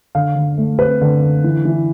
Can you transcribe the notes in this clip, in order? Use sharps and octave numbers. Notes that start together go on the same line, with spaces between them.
D3 F5
D3
A3
C4 B4
D3
D3
E3
E3